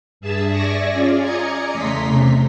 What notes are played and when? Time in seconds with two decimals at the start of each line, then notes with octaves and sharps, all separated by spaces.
0.20 G2 G#4 E5 A5 E6
0.49 D5 E5 G#5 C#6 A#6
0.91 C#4 F4 G#4 D5
1.21 D5 D#5 G#5 A#5 G#6 C#7
1.71 E2 C#3 A3 A#5 C6 B6
2.06 C3